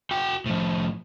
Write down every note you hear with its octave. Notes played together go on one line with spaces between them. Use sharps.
F#4 G5
A2 F3